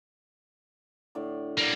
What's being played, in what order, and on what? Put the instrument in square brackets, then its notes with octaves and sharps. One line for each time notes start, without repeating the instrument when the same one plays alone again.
[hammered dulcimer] A2 D3 D5
[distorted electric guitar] G3 A#3 [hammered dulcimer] B4 D5 F#5